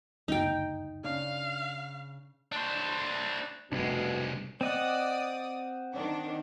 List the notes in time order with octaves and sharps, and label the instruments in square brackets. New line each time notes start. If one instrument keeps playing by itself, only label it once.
[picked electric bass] F#1 D2 G2 [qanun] D#4 G5
[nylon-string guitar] C#3 D4 [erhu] F5
[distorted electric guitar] D4 C5
[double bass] F1 [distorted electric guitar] C2 G#3 [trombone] B2 [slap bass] G3 B3 D4
[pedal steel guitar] C4 D#5 F#5 [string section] D5 D#6
[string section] D#3 D4